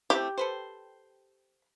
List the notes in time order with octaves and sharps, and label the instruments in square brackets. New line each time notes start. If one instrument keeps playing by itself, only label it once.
[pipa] A3 C4 E4 [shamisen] G4
[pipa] A4 B4 C5